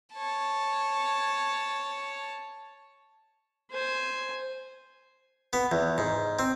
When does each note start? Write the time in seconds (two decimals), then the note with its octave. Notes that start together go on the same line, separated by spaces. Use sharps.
0.14 C#5 A5
3.71 C5 G#5
5.53 B3
5.72 E2
5.98 G#2
6.39 C4